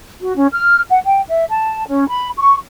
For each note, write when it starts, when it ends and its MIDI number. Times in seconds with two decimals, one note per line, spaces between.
0.21 0.36 66
0.36 0.47 61
0.53 0.80 89
0.89 0.99 78
1.05 1.21 79
1.28 1.44 76
1.49 1.87 81
1.88 2.06 61
2.08 2.28 83
2.37 2.56 85